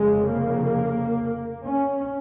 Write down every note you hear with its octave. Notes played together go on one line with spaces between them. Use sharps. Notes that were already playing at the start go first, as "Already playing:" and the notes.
Already playing: F1 F2 C#3 G#3
A#3
C#4